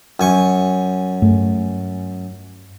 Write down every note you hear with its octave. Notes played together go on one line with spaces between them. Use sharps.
F#2 G#5 C#6
G2 A3